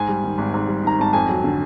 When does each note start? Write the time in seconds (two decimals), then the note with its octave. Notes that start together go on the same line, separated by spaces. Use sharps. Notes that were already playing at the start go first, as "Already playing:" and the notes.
Already playing: G#2 G#5
0.08 G3
0.23 D#3
0.38 G#1
0.54 G#2
0.68 G3
0.84 D#3 A#5
0.99 G#1 A5
1.13 F2 G#5
1.28 F#3
1.44 D3